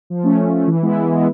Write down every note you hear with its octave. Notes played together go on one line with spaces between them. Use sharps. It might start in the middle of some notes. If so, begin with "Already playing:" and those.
F3
A3 C#4
F3
A3 C#4
E3
G#3 B3 E4
E3
G#3 B3 E4